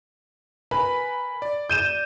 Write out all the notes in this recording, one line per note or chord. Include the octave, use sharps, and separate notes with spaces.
A#4 B4 G#5 B5
D5
G6 D#7 E7